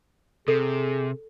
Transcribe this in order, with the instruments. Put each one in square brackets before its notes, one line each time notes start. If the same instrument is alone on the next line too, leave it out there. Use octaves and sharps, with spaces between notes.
[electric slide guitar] C3 [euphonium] G#4 [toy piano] A4